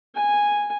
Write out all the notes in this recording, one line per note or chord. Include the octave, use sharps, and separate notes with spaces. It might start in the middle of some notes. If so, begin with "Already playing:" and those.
G#5